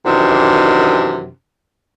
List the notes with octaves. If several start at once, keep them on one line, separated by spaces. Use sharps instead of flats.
F#2 C3 D#3 E3 D4